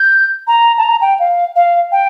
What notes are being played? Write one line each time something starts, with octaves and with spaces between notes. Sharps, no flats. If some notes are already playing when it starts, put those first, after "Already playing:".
Already playing: G6
A#5
A5
A#5
G5
F5
F5
G5